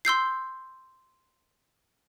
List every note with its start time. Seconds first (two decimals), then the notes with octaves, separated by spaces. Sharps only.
0.05 C6 E6 G6 C7